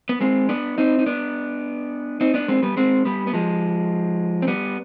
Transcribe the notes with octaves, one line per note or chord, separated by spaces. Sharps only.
B3
G#3 C4
B3 D4
C4 D#4
D#4
B3 D4
C4 D#4
B3 D4
G#3 C4
G3 B3
G#3 C4
G3 B3
B3
F3 G#3
C4
G3 B3